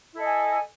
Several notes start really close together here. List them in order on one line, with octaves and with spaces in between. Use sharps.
E4 A4 D#5 G#5